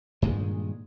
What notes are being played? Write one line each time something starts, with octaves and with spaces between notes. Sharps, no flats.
G2 A#2 D#3 G#3